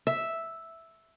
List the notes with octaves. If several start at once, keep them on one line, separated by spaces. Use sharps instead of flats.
E5